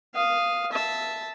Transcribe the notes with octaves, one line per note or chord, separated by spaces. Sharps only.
F5 D#6
E5 A5